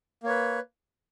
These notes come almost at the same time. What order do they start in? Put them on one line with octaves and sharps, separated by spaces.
A#3 C#5 B4